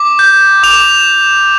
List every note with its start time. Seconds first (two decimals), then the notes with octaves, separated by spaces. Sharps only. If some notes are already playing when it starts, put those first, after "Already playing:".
Already playing: D6
0.19 G6
0.63 D6 F7